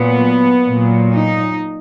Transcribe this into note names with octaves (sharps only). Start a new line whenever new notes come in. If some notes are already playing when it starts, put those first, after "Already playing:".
Already playing: A#2 F#3 B3
A#2 F#3
D#4